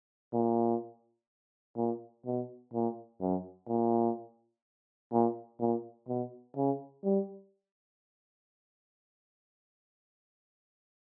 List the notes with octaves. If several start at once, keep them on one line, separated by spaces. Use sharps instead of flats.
A#2
A#2
B2
A#2
F#2
A#2
A#2
A#2
B2
C#3
G3